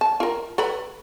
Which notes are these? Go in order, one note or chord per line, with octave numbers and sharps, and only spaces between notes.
A5
F4 A#4
A4 B4 B5